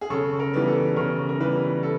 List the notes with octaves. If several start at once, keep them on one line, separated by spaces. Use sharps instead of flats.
G#4
C#3 A4
A#4
E3 G3 B3
A4
C#3 A#4
A#4
E3 G3 B3 B4
A4